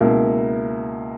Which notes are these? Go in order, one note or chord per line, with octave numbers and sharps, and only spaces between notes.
C#2 B2 A#3 E4 A#4